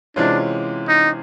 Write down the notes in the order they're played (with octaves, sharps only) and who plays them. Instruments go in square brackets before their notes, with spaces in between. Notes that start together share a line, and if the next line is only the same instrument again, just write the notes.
[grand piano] C3 E3 G#3 C#4 F4 [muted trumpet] D4
[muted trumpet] D#4